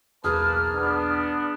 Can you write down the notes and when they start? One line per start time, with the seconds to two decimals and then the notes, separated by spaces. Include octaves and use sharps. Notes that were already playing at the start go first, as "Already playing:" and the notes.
0.24 B1 E2 A#3 G#4 B4 A5 F6
0.74 B3 D4